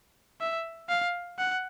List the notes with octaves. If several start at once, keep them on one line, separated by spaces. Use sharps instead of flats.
E5
F5
F#5